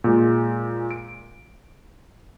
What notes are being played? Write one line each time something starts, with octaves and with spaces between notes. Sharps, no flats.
A#2 G#3
D7